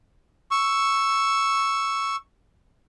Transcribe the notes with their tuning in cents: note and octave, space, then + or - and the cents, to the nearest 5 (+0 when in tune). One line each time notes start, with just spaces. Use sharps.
C#6 +0 E6 +0